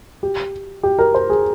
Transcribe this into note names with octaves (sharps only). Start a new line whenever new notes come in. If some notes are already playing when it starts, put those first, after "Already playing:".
G4
G4
A#4
C5
G#4